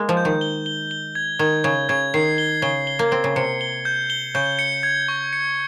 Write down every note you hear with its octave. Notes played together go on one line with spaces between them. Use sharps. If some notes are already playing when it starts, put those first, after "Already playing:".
Already playing: G#3 A#3
F3
G6
D#3
G7
G7
G7
G#6
D#3 G#6
C#3 G#6
C#3 G#6
D#3 C7
G7
C#3 G7
G7
A#3
C4 G7
C#3
C3 C#7
G7
G6
G7
C#3 G6
C#7
G#6
C#6
C#7